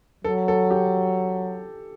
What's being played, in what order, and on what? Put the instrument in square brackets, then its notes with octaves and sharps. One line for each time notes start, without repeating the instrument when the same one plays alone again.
[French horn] F#3 [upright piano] A4
[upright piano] A4
G4